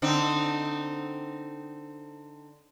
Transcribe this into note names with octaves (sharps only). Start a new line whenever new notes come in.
D3 C4 D#4